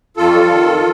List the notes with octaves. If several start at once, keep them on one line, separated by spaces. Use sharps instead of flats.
F2 F4 A4
G3
D#3
F2